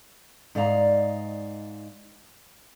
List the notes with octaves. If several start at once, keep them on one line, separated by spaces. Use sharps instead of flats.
G#2 D5 D#5 F5 A5 A#5